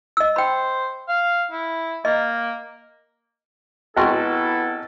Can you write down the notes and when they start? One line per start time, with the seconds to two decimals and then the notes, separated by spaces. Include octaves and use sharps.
0.17 D#5 E6
0.36 C5 G5 B5
1.08 F5
1.51 E4
2.05 A#3 D#5
3.97 G#1 B3 E4 F#4 A4 C6